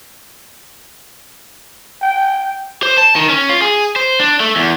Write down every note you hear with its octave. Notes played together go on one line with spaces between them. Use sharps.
G5
C5
A5
D#3
C#4
F4
G#4
C5
D4
A3
E2